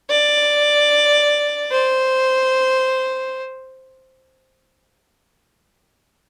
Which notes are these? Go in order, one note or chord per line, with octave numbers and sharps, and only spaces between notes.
D5
C5